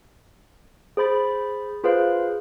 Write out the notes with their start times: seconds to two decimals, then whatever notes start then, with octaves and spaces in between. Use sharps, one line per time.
0.97 G#4 C5 B5 A6
1.84 F4 G#4 B4 C5 F5